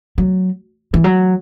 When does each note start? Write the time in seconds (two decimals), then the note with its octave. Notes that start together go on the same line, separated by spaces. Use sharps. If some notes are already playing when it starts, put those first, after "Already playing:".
0.18 F#3
0.94 E3
1.04 F#3